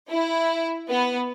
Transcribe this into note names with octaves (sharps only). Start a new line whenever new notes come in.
E4
B3